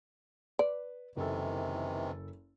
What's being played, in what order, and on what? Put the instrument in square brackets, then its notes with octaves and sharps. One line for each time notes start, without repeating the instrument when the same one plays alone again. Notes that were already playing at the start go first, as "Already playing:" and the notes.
[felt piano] B4 [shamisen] D5
[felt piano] F#1 A4 [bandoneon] C3 D#3 E3